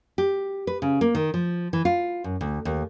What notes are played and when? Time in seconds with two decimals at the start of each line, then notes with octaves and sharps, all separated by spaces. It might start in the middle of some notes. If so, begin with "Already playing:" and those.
0.18 G4
0.67 B4
0.82 C#3
1.01 A#3
1.15 D#3
1.34 F3
1.73 E3
1.85 F4
2.24 F#2
2.41 D2
2.65 D#2